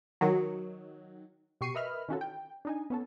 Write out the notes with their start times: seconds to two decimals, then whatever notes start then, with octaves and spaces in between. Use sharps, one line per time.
0.21 D#3 F#3
1.61 B2 G4 C#6 C7 C#7 D#7
1.75 A#4 B4 D#5 E5 B5 F6
2.08 D#3 E3 C#4 F4 F#4 A4
2.21 G5
2.65 D4 D#4 G#5
2.90 B3 C#4 A4